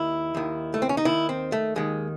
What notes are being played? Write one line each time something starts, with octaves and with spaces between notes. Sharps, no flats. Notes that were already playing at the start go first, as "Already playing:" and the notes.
Already playing: D#2 D#3 E4
D#2 D#3
A3
C4
C#4
D#4
D#2 D#3 E4
C4
A3
D#2 D#3 G#3